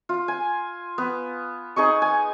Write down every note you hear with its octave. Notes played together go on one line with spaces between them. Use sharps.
F4
G#5
B3
D#4 G#4 D#5 C#6
G#5